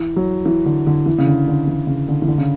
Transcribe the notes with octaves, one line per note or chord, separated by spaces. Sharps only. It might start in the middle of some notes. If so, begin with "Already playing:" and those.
Already playing: E3
F#3
E3
D3
D3
E3
C#3
D3
D3
E3
C#3
D3
E3
D3
C#3